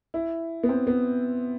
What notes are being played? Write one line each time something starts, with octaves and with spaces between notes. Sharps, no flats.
E4
B3
C4
B3